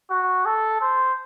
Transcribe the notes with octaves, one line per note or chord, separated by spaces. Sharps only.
F#4
A4
C5